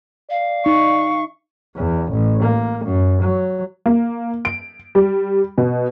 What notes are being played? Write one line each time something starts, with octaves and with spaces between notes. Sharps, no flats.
D5 F5
D#4 C#6
E2
A1
A#3
F#2
F#3
A#3
D7
G3
B2